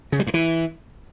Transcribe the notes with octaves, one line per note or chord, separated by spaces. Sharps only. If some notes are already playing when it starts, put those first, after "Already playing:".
C#3
G3
G2
E3